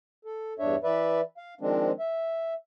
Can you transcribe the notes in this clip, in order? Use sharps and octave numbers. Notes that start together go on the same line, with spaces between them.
A4
E2 G2 D4 C#5 E5
E3 B4 D5 E5
F5
D#3 F3 G#3 C4 D4
E5